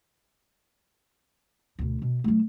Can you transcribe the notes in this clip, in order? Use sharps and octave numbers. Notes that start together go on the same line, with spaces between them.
D2 B2
B2
F#3 A3